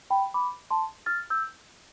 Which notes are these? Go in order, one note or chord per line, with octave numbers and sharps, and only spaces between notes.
G5 B5
B5 D6
A5 C6
F6 A6
E6 G6